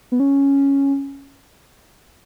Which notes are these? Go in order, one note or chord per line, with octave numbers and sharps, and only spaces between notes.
B3
C#4